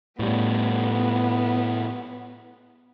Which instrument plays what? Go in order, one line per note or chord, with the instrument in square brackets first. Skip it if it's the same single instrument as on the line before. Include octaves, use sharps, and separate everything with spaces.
[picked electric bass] A2 G3 [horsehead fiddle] B3